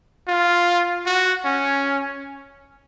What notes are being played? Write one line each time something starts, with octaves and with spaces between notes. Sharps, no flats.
F4
F#4
C#4